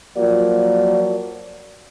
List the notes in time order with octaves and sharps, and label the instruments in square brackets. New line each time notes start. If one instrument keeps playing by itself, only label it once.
[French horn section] F3 F#3 A#3 F4 F#4 D5